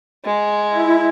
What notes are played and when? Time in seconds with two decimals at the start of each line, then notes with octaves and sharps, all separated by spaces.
0.25 G#3
0.70 E4